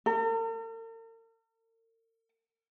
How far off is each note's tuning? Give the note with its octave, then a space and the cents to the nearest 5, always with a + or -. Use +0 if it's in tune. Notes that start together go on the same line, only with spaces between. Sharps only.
A#4 -45